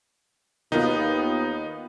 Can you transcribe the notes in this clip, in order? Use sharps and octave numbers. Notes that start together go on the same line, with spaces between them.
D#2 D#3 B3 D#4 F4